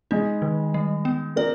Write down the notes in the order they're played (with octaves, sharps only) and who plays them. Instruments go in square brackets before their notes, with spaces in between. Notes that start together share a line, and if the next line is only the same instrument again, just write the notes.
[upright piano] G#3 G#4 [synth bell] D#4
[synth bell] D#3
G3
B3
[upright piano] A#3 A#4 [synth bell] D5